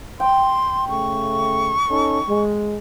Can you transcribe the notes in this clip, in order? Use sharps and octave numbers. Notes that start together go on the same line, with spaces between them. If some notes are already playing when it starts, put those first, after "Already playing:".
G5 C6
C#3 A3 C#6
C#4 D#4 A4
G#3